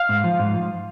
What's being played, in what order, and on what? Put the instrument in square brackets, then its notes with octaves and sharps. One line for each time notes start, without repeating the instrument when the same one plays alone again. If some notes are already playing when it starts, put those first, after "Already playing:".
Already playing: [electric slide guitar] F5
G#2
F3
G#2
F3